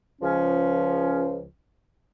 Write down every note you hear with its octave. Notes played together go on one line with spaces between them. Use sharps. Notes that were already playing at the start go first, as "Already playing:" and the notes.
C#2 F3 C#4